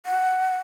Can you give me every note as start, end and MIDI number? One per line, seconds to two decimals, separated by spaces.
0.06 0.59 78